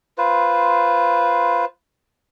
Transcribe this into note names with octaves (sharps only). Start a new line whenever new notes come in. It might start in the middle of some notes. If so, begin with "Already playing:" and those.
F4 B4 C5